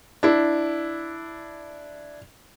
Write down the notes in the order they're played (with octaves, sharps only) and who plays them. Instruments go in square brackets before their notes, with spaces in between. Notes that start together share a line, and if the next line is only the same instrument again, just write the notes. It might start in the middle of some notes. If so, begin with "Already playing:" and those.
[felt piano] D4 E4